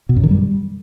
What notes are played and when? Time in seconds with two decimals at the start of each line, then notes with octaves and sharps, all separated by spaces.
0.09 B2
0.16 F#2
0.23 D#3
0.31 G3